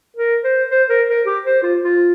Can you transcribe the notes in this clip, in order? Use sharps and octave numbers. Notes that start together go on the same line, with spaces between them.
A#4
C5
C5
A#4
A#4
G4
C5
F4
F4